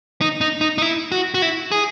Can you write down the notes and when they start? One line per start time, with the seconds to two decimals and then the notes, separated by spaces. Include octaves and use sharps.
0.21 D#4
0.41 D#4
0.61 D#4
0.78 D#4
0.82 E4
1.12 F#4
1.34 F#4
1.42 E4
1.71 G#4